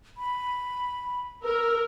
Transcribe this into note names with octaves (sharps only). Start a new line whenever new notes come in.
B5
A#4 E6